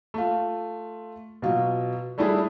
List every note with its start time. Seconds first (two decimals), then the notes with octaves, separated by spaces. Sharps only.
0.14 A3 F4
1.42 B2 F#3 F4
2.18 G3 A3 D4 E4 G#4